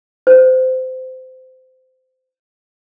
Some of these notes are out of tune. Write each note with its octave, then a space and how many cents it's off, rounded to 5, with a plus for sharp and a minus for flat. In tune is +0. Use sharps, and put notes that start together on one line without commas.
C5 -25